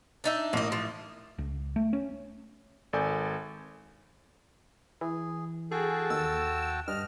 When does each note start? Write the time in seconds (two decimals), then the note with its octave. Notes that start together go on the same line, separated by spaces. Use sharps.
0.24 D4 D#4 E5
0.53 A1 A#3 D#5 E5
0.72 F3
1.38 C#2
1.76 A3
1.93 C#4
2.93 G#1 A4 D5 G#5 G6
5.01 E3 G#4
5.71 F#4 G#4 A4 G5 A5
6.10 D#2 E6
6.88 G2 D#5 F6